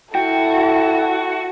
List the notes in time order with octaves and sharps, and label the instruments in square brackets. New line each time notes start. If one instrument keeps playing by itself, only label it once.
[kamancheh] E4 A4 [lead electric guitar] F#4 [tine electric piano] G5